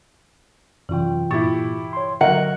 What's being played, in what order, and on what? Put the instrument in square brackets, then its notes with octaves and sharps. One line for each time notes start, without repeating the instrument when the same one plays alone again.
[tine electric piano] F#2 F4 G5 [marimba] C3 E3
[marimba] G2 F4 A6 [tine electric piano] A#2 [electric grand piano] E4 G4 C#6
[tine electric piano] C#5 C6
[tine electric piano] D3 [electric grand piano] F#3 F#4 A#4 [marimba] D#5 E5 A#5 [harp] F#5